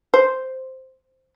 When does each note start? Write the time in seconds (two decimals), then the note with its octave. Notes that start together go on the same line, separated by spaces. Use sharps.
0.14 C5